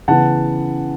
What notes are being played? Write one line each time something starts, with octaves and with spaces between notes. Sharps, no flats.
C#3 E3 B3 F#5 A5